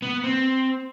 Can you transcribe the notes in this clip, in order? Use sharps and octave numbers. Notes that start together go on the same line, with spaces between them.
B3
C4